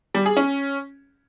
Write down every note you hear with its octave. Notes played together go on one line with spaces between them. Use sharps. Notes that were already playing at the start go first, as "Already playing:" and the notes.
G3
G#4
C#4